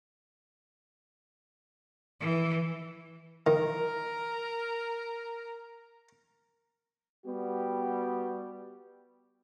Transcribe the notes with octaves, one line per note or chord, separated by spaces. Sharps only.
E3
D#3 A#4
G3 B3 F#4 G4